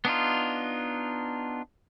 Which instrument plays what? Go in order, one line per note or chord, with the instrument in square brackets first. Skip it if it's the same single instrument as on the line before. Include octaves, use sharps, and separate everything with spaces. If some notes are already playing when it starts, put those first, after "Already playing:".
[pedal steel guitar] B3 D4 D#4 F4